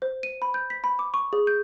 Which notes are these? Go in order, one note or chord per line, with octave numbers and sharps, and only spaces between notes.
C5
D#7
B5
G6
B6
B5
D6
C#6
G#4
G6